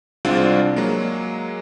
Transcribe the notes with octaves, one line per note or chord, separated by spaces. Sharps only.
C2 G#3 C4 D4 F4 D5
F#3 G#3 A#3